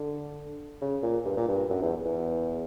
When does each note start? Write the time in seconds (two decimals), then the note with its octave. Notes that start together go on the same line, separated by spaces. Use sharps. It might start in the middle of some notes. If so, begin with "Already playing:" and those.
Already playing: D3
0.82 C#3
1.03 A#2
1.25 G2
1.37 A#2
1.48 G2
1.70 F#2
1.82 E2
2.05 E2